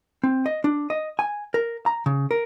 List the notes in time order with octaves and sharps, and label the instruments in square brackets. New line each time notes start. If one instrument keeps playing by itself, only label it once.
[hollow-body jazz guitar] C4
D#5
D4
D#5
G#5
A#4
A#5
C#3
A#4